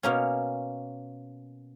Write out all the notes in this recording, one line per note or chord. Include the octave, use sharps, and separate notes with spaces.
B2 A#3 C#4